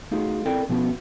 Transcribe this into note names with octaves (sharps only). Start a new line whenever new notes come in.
A3 D#4 F4 F#4 G#4
C4 E4 A4 A#4 D5 G5
B2 F3 B3 C#4 F#4